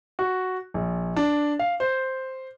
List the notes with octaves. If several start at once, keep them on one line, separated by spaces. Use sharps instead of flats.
F#4
A#1
D4
F5
C5